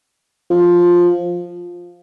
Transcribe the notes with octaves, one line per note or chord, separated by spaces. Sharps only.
F3